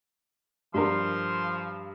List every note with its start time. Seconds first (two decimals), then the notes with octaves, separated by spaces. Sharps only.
0.74 G2 F3 A#4 C6